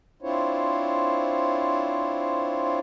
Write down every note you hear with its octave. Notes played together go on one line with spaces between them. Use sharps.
C4 D4 E4 F4 C5 C#5